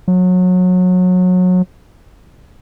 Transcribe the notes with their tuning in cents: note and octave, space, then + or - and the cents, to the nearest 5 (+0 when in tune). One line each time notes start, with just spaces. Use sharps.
F#3 -25